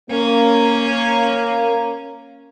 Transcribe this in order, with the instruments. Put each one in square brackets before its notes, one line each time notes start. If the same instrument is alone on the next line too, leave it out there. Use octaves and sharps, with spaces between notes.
[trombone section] A#3 [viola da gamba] C#4